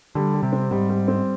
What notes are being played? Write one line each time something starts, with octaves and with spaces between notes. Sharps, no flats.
D3 G3
G3
C3
C4
G#2 G3
G3
C4